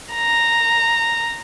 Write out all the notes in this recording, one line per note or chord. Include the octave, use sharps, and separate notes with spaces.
A#5